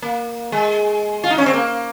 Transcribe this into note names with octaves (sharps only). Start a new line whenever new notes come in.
A#3
G#3
F4
D#4
C#4
C4
A#3